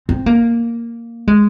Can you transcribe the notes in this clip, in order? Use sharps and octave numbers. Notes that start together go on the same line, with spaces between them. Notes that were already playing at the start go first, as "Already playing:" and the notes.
C4
A#3
G#3